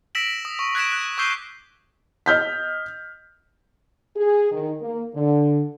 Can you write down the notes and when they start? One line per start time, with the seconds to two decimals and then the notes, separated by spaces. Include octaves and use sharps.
0.15 E6 A#6 B6 D7 E7 F#7
0.45 D#6
0.59 C#6
0.75 F#6 G#6 B6 D7 E7
0.92 F#6
1.18 C#6 D6 E6 G6 C7 G7
2.26 D#5 F6 G6 B6
4.16 G#4
4.52 D#3
4.81 A#3
5.15 D3